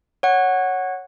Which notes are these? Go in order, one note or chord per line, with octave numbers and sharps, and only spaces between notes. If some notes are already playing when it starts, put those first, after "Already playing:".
C#5 F#5